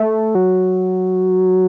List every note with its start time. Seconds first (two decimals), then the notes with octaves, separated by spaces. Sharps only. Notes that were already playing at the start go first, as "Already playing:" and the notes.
Already playing: A3
0.35 F#3